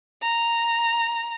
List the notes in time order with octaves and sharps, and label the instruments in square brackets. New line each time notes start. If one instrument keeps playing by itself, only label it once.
[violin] A#5